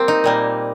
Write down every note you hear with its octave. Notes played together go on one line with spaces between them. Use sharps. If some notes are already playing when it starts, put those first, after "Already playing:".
Already playing: G3 A#3 C4
D#4
A#2 G3 A#3